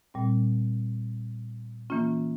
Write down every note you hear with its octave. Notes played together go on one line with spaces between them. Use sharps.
A#2 G3 C4
E3 A#3 C#4 F4